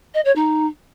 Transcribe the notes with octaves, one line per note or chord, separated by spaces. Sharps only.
D#5
C#5
D#4